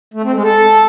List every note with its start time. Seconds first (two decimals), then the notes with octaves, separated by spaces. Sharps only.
0.14 A3
0.23 C4
0.33 G#3
0.43 A4